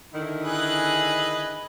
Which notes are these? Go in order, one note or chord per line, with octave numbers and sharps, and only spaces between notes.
D3 D#3 E4
G#4 B4 D#5 G#5 F#6